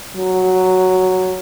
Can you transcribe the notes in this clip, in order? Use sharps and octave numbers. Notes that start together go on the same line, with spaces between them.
F#3